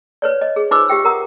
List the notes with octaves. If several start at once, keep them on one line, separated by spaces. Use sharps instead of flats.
B4 C#5 D5
D#5
G#4
D#4 F4 B4 C5 D6 E6
G4 E5 G5 E6
A#4 F#5 A#5 D#6